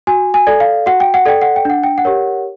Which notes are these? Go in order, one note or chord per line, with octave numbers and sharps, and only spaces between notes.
F#4 G#5
G#5
A4 D5
F5
F#4 F#5
G5
F#5
A4 D5 G5
F#5
G5
D4 F#5
G5
F#5
G4 A#4 C#5